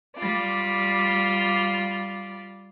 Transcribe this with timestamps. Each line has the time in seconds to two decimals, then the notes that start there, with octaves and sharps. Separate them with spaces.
0.17 G3 F4 D5